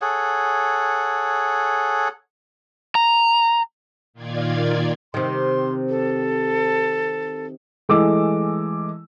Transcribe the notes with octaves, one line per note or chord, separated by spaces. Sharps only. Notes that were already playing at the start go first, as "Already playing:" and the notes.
G#4 A4 C#5 F#5
A#5
A#2 D#3 F4 D5 G#6
C3 D#3 C6
A4
E3 G#3 A3 D6 E6